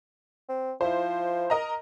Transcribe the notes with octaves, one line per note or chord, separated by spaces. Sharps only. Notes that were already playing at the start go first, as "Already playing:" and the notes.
C4
F3 E4 C5
A#4 D#5 A#5